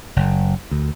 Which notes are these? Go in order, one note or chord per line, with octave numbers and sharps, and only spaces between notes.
F#1
D2